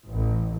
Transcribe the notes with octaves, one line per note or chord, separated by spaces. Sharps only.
A1